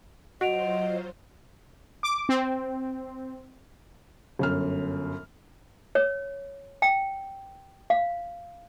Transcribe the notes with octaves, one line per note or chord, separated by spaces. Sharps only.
F#3 F4 F#4 C5 D#5 F#5 D7 F7
D6
C4
G1 F#2 F6
C#5
G5
F5